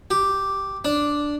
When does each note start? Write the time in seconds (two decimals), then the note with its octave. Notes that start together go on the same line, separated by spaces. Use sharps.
0.11 G4
0.85 D4